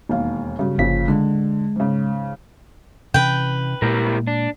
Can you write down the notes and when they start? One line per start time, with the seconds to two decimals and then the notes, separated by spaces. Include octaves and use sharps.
0.09 E1 D#2 F5
0.59 G2 C#3 F#3
0.78 G1 A#2 C#3 F3 B6
1.08 D3 G#3
1.76 G#2 C#3
3.14 C3 E3 C#4 B4 G5
3.82 A#2 G#3 A#3 E4 G4 A#4
4.27 D4